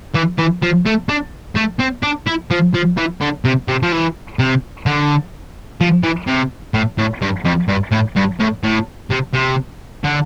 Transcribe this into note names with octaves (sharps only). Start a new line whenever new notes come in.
E3
E3
F3
A3
D4
A3
C4
D4
E4
F3
F3
E3
D3
C3
C3
F3
E3
C3
D3
F3
E3
C3
A2
A2
G2
F2
G2
A2
G2
A2
A2
C3
C3
D3